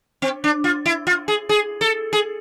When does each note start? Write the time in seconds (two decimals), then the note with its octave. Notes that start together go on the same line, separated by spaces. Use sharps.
0.22 C4
0.44 D4
0.64 F4
0.86 E4
1.07 F4
1.28 G#4
1.49 G#4
1.81 A4
2.13 G#4